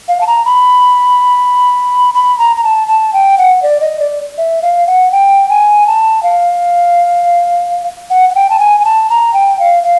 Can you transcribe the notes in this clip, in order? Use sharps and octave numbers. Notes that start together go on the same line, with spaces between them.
F5
A5
A#5
B5
B5
A#5
A#5
A5
A5
G5
F#5
D5
D#5
D5
E5
F5
F#5
G5
G#5
A5
F5
F#5
F#5
G5
A5
G#5
G#5
A5
A#5
G5
F5
F5